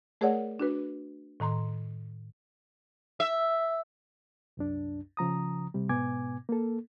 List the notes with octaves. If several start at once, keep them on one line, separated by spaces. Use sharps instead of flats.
A3 G#4 A#4 C#5 D5 F#5
D4 F#4 B4
A2 D#3 A#5 C6
E5
C2 F#2 D4
C#3 F3 A#5 D#6
C3 G3
G#2 B2 B3 G#5 D6 G#6
A#3 A4